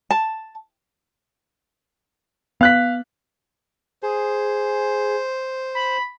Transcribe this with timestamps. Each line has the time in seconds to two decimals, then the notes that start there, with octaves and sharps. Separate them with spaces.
0.10 A5
2.61 B3 F5 F#6 B6
4.03 G#4 C5
5.75 B5